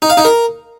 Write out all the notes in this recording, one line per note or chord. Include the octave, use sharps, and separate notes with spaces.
D#4
F5
D#4
A#4